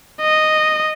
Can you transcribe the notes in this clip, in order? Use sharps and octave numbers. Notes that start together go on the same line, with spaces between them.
D#5